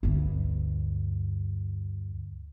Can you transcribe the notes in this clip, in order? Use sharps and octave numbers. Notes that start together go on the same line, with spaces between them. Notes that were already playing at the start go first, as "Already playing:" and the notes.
D2 G2